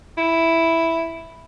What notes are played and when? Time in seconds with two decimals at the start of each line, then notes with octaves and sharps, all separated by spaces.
0.18 E4